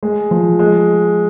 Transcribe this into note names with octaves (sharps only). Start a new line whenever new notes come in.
G#3
F3
G#3